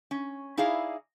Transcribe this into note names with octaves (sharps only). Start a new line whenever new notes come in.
C#4
D#4 E4 G#4 D5 F5